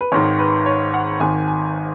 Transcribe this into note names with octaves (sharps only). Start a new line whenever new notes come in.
B4
G#1 G#2 D#3 C#5
B4
C#5
F#5
G#1 G#2 D#3 G#5
G#5